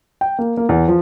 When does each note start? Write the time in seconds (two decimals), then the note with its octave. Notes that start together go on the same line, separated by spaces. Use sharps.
0.21 G5
0.39 A#3
0.57 A#3
0.69 E2
0.88 F3